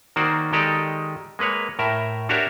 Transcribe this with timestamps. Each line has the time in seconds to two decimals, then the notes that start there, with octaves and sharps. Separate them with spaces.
0.16 D#3 A#3 F#4 C5 D5
0.53 D#3 G#3 G4 A4 D5 D#5
1.39 G#3 A#3 B4 C#5
1.79 A2 A#4 E5
2.29 D4 F#4 G4 A#4 C#5 E5